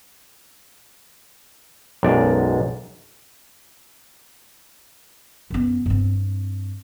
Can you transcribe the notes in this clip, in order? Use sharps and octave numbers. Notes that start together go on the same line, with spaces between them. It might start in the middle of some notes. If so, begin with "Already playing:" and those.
B1 F#2 G#3 D5
F#2 B3
G2 C4